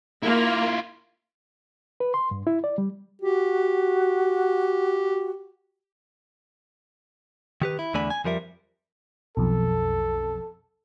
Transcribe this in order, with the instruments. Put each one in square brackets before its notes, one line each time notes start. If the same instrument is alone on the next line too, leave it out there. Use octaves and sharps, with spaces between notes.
[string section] A#3 [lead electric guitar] E4 F4
[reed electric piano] B4
C6
G2
E4
D5
G3
[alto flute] F#4 [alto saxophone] G4
[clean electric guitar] D#3 G4 B4
E4
E2 D3 A3 D5 G#5 B5
G#5
F2 F3 G3 A#4 E5
[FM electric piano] B1 F2 [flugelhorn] A4